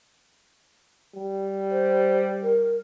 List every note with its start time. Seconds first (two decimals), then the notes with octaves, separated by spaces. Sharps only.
1.15 G3
1.71 C5
2.43 A#4